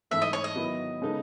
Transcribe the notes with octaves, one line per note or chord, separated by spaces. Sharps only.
G#2 E3 A3 E5
D#5
C#5
D#5
D#3 F#3 B3 E4
C#3 G#3 B3 D#4 A4